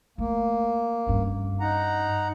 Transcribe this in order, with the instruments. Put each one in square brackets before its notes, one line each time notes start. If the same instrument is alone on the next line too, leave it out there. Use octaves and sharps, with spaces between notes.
[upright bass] A3 [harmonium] A#3
[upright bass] G2 C#4
[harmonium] D#4 F#5 A#5